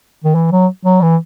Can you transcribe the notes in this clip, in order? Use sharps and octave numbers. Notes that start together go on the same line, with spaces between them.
D#3
E3
F#3
F#3
E3